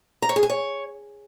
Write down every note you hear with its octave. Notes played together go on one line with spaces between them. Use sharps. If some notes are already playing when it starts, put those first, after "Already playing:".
A#5
C#5
G#4
G#5
C#5